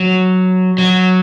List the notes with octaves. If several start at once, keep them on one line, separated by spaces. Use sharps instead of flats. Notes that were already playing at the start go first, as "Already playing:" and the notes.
Already playing: F#3
F#3